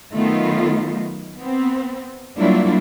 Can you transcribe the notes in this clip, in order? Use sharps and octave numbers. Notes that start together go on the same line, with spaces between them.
D#3 F#3 A3 B3 D#4 F4
B3 C4
F#3 G3 A#3 D4 E4 F4